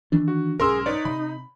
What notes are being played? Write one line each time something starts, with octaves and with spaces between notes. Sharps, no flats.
D#3 E3 D4
F#4
B1 G#2 C#4 G#4 A#4 C6 E6
D#4 B4 C#5 D5
C3 B5